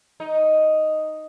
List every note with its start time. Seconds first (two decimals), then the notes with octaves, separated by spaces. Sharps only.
0.20 D#4